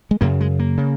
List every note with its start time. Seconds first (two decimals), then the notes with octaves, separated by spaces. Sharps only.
0.11 G#3
0.21 F#2 C#3 A#3
0.41 G#3
0.59 A#3
0.77 C#3